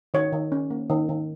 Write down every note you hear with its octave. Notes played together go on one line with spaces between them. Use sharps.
D#3 C#5
D#3
C#4
A#3
D#3
D#3